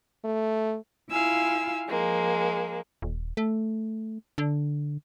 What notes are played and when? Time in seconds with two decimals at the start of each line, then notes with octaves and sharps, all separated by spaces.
0.24 A3
1.10 E4 F4 F5 G#5 E6
1.88 F3 G#3 A#3
3.02 D#1
3.37 A3
4.38 D3